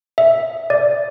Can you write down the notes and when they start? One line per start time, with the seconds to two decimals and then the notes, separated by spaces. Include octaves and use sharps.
0.18 E5
0.70 D5